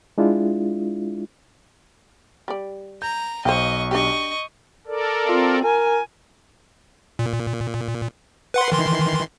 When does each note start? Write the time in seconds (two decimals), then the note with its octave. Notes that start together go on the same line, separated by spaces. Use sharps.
0.18 G#3 D4 E4 F4
2.48 G3 D5
3.02 A#5 G6
3.45 B1 C5 D#5 F5 G5 C#6
3.91 D4 G4 D#5 C#6
4.87 A4 A#4 D5
5.27 C4 F4
5.64 A#4 G#5
7.19 A#2
8.54 B4 F#5 C6
8.72 D#3 E3 C6